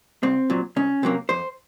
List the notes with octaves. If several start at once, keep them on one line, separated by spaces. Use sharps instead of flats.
C2 C4
A#2 F#3
C2 C#4
C3 F#3 A#3
F2 C5